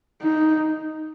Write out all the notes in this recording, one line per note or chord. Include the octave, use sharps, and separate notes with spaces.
D#4